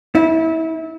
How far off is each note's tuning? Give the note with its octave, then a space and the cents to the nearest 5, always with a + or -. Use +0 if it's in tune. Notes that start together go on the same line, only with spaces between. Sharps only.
E4 -30